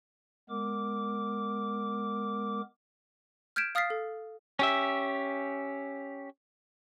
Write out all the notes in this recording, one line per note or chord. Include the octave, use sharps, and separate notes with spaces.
G#3 B3 A#4 D6
F6 G6 G#6 B6 D7 E7
F5 D#6 F6 A6 B6 C7
A4
C#4 G4 E5